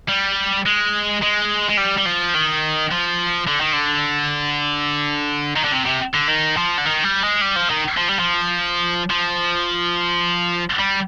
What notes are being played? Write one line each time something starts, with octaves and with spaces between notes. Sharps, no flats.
G3
G#3
G#3
G#3
G3
G3
F3
D#3
F3
D3
D#3
D3
D#3
D3
C3
C3
D3
D#3
F3
D3
D#3
G3
G#3
G3
F3
D#3
F3
G3
F3
F3
G3